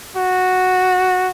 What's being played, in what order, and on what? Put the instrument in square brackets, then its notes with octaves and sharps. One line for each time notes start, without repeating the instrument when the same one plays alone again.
[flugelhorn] F#4